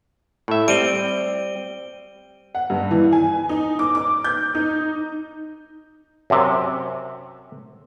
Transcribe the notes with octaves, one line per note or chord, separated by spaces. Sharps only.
A2 E5
G3 C4 D7 D#7 G7
F#5
G2
E3
G#5
D#4
D6
D6
G6
D#4
F#2 C3